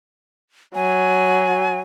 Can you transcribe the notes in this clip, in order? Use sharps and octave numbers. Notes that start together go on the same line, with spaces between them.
F#3 G#5